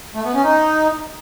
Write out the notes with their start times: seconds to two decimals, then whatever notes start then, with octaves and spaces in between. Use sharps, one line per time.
0.14 A3
0.24 B3
0.34 C#4
0.44 D#4